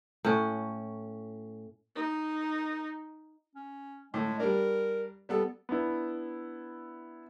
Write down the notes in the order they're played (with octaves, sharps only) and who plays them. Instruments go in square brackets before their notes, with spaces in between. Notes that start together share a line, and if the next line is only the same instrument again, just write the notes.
[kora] A2 C#4
[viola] D#4
[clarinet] C#4
[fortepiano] A2 [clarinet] G#3
[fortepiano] G3 D4 [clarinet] A#4
[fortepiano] G3 B3 A4
[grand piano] B3 D4 E4